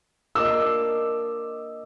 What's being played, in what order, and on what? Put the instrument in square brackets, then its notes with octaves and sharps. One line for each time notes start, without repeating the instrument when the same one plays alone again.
[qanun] A#3 D4 F4 [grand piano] D#5 D6 E6